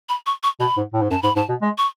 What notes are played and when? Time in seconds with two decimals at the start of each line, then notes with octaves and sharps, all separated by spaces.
0.09 B5
0.26 C#6
0.43 C#6
0.60 B2 B5
0.77 G#2
0.93 A2
1.02 G#2
1.11 F#2 A5
1.23 G#2 B5
1.36 G#2 A5
1.49 B2
1.62 G#3
1.78 C#6